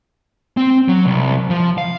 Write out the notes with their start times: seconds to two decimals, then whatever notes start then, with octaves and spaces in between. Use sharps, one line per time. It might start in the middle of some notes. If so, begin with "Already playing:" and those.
0.57 C4
0.88 F#3
1.06 C2
1.50 F3
1.78 F5